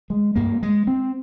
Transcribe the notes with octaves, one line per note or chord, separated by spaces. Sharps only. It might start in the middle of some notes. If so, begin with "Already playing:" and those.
G#3
G2 A#3
G#3
C4